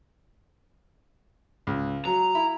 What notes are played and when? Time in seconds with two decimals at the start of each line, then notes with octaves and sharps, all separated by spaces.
1.67 C#2
2.05 F#3 A#5
2.35 E4 B5